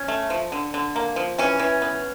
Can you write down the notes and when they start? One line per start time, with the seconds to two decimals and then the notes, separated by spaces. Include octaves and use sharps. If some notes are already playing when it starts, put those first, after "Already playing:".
Already playing: C#4
0.08 A3
0.30 F3
0.52 D3
0.74 D3
0.96 A#3
1.16 F3
1.38 E3 C#4
1.59 E3
1.82 B3